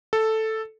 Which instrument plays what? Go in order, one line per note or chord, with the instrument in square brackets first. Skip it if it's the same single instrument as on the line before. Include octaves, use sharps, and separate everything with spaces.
[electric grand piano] A4